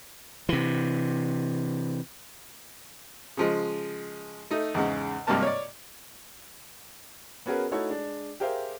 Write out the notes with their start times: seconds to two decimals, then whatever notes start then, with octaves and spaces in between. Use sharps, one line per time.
0.49 C3 E3
3.37 C#3 F3 G#3
4.51 A3 D#4
4.74 E2 G#2 C#3
5.27 G#1 G2 C3 A#3 A#4 A5
5.43 C#5 D5
7.46 B3 C#4 F#4 G#4 A#4 B4
7.71 A3 D#4 E4 F#4 A4 C#5
7.89 G#3 D4
8.40 G4 G#4 A#4 C5 E5 F5